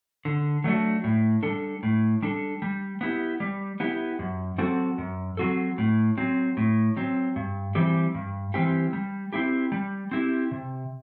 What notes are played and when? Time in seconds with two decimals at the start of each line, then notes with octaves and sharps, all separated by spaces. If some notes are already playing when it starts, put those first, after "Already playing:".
0.25 D3
0.64 F#3 A3 D4 F#4
1.04 A2
1.43 G3 D4 A4
1.83 A2
2.22 G3 D4 A4
2.62 G3
3.01 B3 E4 G4
3.40 G3
3.80 B3 E4 G4
4.19 F#2
4.58 F#3 C4 F#4 A4
4.98 F#2
5.37 F#3 C4 F#4 A4
5.78 A2
6.18 F#3 C4
6.57 A2
6.97 F#3 C4
7.36 G2
7.75 E3 G3 C4 G4
8.15 G2
8.54 E3 G3 C4 G4
8.93 G3
9.33 C4 E4 G4
9.72 G3
10.12 C4 E4 G4
10.51 C3